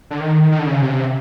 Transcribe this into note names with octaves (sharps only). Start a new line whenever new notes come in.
D3
D#3
D#3
D3
C#3
C3